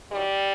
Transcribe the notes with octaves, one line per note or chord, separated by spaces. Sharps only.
G2 D#3 F#3 G3